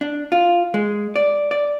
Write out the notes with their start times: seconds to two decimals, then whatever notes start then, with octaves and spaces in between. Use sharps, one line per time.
0.01 D4
0.32 F4
0.74 G#3
1.16 D5
1.51 D5